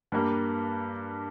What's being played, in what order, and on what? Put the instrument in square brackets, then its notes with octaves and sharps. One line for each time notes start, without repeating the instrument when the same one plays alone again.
[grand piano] G2 G3 A#3